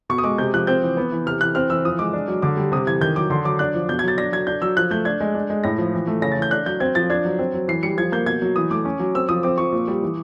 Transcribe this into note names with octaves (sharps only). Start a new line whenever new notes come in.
B2 C#6
D#6
G#3 D6
C3 G6
F3 F#6
C4 G6
E3
B3
E3
C3 F6
E3 F#6
C4 F6
E3 E6
F3 D#6
G#3 D6
D4
F#3
D3 D6
G3
C3 D#6
E3 G#6
D#3 G6
F#3 D6
D3 C6
F#3 D6
D4 F#6
F3
B2 G6
G#6
F#3 A6
D4 A#6
F#3 G#6
D4 G6
F#3 E6
F3 F#6
A3 G6
D4 G#6
G#3
D4
G#3
A2 A#6
F3
E3
A3
C#3 A#6
A6
E3 G6
D4 F#6
F#3 G6
C4 G#6
F3 A6
D4 G#6
F#3
C4
F#3
E3 C7
G3 C#7
F3 G#6
A#3 G6
B2 G#6
F#3
E3 D#6
A3 D6
C#4
F#3
C4 E6
F3 D#6
C4 D6
F3 C#6
A#2
G3
E3